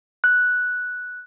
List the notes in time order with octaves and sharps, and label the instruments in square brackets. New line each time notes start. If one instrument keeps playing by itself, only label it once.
[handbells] F#6